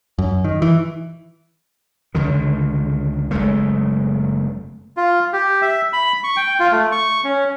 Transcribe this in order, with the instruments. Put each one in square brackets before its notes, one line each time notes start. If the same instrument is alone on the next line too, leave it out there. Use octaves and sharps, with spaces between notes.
[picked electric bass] F#2
D#3
E3
[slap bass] C#2 D3 D#3
F#1 G#3 A3
[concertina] F4
G4
E5
B5
C#6
G5
F4
A3
C#6
C#4